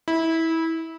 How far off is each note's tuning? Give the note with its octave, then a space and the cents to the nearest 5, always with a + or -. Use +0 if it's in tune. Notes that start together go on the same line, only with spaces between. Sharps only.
E4 -20